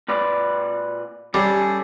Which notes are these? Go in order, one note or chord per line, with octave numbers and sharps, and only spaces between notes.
A#2 B4 D5
G3 C#4 G#4 A4